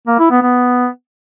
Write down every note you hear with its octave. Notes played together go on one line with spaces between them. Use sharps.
A#3
E4
B3
B3